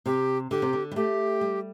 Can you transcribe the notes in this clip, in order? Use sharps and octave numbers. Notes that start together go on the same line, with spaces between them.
C3 G4
D3 G4
C3
D3
G3
A3 G4
G3